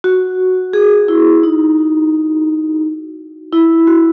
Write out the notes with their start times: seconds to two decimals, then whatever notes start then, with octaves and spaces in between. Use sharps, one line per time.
0.04 F#4
0.73 G#4
1.08 E4
1.43 D#4
1.78 F#4
3.52 E4
3.87 F#4